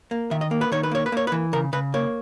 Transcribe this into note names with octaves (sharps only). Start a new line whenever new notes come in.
A#3
D#3 E5
D#5
A#3
B4
D#3 C#5
B4
A#3 C#5
B4
A#3 C#5
B4
E3
C#3 A#4
C#3 B4
A#3 C#5